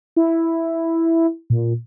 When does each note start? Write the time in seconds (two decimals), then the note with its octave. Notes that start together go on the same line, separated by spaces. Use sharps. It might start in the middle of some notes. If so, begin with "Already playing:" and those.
0.16 E4
1.50 A#2